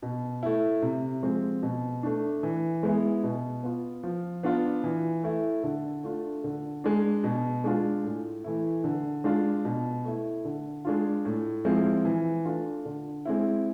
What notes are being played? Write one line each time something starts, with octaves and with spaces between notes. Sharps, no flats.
B2
A3 E4
C3
F3 G#3 C4
B2
A3 D4
E3
G#3 B3 E4
B2
B3 F4
F3
B3 D4 F4
E3
A3 E4
D3
A3 D4 F4
D3
G#3 D4
B2
G#3 D4 F4
A2
E3 A3 E4
D3
G#3 D4 F4
B2
A3 E4
D3
G#3 D4 F4
A2
F3 G#3 C4 E4
E3
A3 D4 F4
D3
G#3 C4 E4